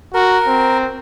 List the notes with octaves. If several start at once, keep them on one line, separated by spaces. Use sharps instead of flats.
F#4 A#4
C4